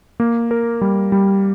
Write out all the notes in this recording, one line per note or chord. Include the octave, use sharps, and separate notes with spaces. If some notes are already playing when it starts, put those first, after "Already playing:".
A#3
A#4
G3
G3